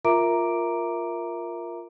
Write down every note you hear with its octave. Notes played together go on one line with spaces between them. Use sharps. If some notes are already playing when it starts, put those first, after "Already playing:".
F4 A#4 E5 A#5 D6 D7